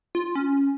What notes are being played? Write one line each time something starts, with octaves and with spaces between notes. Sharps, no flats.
F4
C#4